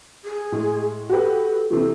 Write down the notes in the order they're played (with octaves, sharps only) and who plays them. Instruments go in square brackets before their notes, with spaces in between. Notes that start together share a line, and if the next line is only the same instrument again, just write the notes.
[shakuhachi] G#4
[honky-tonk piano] A2 G#3
[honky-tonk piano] F#4 G4 B4 [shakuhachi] A4
[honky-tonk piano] C3 E3 [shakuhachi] A4